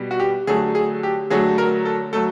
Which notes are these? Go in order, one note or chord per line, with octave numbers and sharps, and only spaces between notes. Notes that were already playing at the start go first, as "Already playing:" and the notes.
Already playing: B2 G3
F#4
G4
D3 F#3 A3 G#4
G#4
G4
D3 F#3 A3 G#4
A#4
A4
F#3 A3 A4